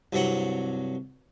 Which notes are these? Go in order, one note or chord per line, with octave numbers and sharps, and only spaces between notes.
C2 G2 F#3 C#5 F#5